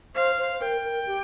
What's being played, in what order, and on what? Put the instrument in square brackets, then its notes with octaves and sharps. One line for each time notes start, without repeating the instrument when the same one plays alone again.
[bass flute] C5 [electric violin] F5
[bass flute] C5
C5
[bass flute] A#4 [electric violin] G5
[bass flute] A#4
G4